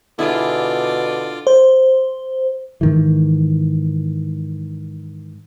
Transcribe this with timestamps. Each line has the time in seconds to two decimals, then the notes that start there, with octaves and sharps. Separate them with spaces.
0.19 B2 D3 E4 F4 G#4 D5
1.47 C5
2.81 G#2 D#3 E3